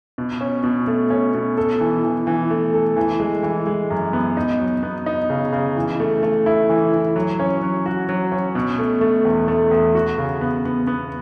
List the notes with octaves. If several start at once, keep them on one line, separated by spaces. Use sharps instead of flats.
B2
C#4
B2
A3
C#4
B2
A4
E3
E3
E3
A3
A4
E3
G#3
E3
G#3
F#2
B3
D#4
F#3
B3
D#4
C#3
C#3
E3
A3
A3
E4
E3
E3
F#3
C#4
F#3
F#4
F#3
C#4
B2
A3
A3
E2
A3
E2
F#4
C#3
B3
B3
B3